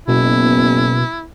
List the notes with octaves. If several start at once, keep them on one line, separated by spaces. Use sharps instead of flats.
F#1 B2 E4